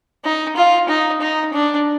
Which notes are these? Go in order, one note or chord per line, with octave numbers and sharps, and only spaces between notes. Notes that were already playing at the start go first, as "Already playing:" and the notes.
D#4
F4
D#4
D#4
D4